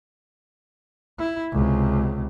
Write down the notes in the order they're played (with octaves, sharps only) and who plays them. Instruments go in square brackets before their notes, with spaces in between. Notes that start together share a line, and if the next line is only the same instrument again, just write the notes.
[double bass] E4
C#2 C3